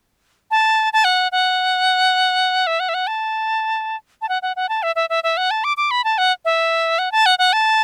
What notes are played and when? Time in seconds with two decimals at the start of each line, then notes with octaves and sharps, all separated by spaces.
0.51 A5
0.93 A5
1.04 F#5
1.32 F#5
2.67 E5
2.80 F#5
2.89 E5
2.94 F#5
3.07 A5
4.22 A5
4.29 F#5
4.42 F#5
4.56 F#5
4.69 A5
4.83 E5
4.96 E5
5.10 E5
5.24 E5
5.37 F#5
5.51 A5
5.64 D6
5.77 D6
5.91 B5
6.04 A5
6.18 F#5
6.45 E5
6.99 F#5
7.12 A5
7.26 F#5
7.39 F#5
7.53 A5